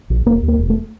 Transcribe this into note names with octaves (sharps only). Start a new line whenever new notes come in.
A#1
E1 A#3
D#2
A#3
E1
A3